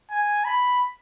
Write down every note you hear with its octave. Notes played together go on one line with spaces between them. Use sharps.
G#5
B5